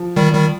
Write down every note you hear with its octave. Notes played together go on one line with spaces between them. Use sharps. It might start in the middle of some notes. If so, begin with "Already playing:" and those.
Already playing: F3
D#3 G3
D#3 G3